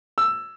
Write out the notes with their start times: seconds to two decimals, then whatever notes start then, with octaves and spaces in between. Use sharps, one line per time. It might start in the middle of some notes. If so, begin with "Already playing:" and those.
0.18 E6